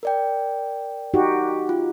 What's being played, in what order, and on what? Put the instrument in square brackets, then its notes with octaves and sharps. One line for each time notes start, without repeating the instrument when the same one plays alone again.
[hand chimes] A#4 D5 G5
[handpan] D#4 F#4 G4
[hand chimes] F4